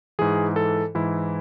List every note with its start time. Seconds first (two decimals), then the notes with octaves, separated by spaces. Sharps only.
0.19 G#2 E3 G#4
0.56 A4
0.95 G#2 E3 E4